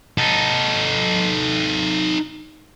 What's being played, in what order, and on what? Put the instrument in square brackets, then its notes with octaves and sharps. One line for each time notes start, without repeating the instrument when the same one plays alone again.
[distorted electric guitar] D#4 A4